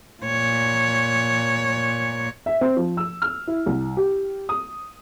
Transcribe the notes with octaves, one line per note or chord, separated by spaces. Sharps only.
A#2 C#5
E5
C4
F3
E6
F6
E4
C2
G4
D#6